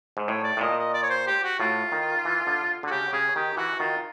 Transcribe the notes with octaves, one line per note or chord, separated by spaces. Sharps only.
G#2
A2 C#5
D5
A2
A#2 D#5
D#5
D5
C#5
C5
G4
F#4
A2 F4
D#3
E3
D3
D3
F#4
C#3 G4
C#3 G#4
D#3 G4
E3 F#4
D#3 F4